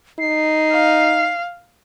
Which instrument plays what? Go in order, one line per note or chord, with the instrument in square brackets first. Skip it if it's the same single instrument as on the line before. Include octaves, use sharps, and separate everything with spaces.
[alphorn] D#4 [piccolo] C7
[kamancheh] F5